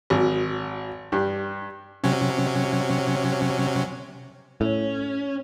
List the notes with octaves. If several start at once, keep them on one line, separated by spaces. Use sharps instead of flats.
G#1 F#3
G2 G4
C3 F#3 C#4
A2 C#4